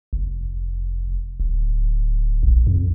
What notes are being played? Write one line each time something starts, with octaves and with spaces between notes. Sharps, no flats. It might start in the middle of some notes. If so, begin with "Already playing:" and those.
F1
D1
A#1
F2